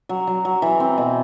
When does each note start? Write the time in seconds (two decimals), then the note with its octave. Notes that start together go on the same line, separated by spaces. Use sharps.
0.09 F#3
0.27 F#3
0.45 F#3
0.62 E3
0.80 C4
0.98 B2